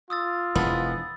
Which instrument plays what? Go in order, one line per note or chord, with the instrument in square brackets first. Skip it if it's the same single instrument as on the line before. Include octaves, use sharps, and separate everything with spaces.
[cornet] F4 [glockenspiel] D#6 E6 A6
[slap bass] E1 E3 [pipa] F3 G#3 B3 [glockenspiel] B5 A6